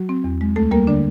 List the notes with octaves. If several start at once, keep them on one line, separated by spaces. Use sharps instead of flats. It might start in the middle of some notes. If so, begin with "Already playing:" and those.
Already playing: F#3 F#4
C4
E2
G#3
D2 A3 A4
G3 A#3 A#4
D3 D4 D5